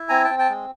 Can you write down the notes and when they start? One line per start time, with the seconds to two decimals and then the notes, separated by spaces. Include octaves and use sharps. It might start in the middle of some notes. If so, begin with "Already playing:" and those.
Already playing: E4
0.09 C4 G#5 A#5
0.24 G5 A5
0.30 C4
0.39 G5 A5
0.49 G#3